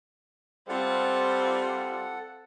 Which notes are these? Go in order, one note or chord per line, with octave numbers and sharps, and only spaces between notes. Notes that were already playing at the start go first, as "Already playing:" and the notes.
G3 C4 F4 A4 F#5